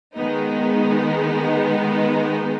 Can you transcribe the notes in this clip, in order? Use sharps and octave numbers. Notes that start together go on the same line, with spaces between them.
D#3 G#3 B3 D#4